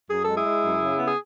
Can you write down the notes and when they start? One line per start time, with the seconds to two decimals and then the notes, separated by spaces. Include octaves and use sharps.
0.09 F#2 G#4
0.23 G#3 A4
0.36 E4 G#4
0.45 G#3
0.63 F#2
0.81 C#3
0.99 B3
1.05 G#4